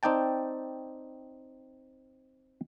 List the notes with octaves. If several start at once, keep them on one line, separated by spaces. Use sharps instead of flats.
C4 D#4 D5 G5 A5